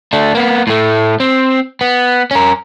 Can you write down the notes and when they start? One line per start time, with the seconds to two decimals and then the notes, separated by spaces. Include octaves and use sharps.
0.13 A3 D4
0.35 A#3 B3
0.67 A2 A3
1.20 C4
1.81 B3
2.31 C#4 A#4